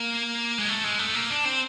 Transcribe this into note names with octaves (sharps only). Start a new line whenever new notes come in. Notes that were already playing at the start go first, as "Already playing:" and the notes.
Already playing: A#3
G#3
A3
G#3
A3
A#3
D4
C4